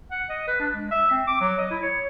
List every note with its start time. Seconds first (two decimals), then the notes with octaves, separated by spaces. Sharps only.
0.11 F#5
0.29 D#5
0.47 B4
0.60 D4
0.73 G#3
0.91 E5
1.11 C4
1.27 D6
1.41 F#3
1.58 D#5
1.71 E4
1.83 C#5